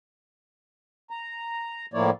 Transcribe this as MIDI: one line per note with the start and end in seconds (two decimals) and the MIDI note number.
1.10 1.86 82
1.94 2.10 45
1.94 2.10 53
1.94 2.10 58
1.94 2.10 64
1.94 2.10 73
1.94 2.10 74